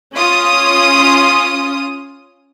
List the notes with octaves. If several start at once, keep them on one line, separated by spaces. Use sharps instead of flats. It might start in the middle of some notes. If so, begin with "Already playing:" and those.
C#4 F4 D#6